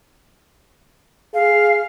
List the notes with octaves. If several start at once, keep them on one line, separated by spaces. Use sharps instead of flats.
G#4 F5